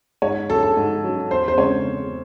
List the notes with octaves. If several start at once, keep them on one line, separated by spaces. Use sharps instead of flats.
G#2 C#5
F#3 C#4 A4
A4
G#2
F#3 C#4
E2 C5
C5
C#3 G#3 C4 C#5
E2